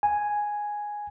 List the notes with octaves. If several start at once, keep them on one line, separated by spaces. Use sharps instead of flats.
G#5